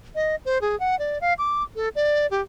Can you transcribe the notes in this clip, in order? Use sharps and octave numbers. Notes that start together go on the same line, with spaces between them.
D#5
C5
G#4
F#5
D5
F5
D6
A4
D5
G4